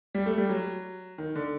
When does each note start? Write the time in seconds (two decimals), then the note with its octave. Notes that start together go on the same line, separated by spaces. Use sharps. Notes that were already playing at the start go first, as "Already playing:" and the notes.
0.14 G3
0.26 A3
0.38 G3
0.49 F#3
1.18 D#3
1.35 D3